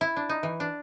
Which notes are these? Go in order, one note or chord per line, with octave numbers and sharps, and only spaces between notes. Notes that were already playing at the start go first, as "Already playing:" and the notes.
E4
D4
D#4
E3
D4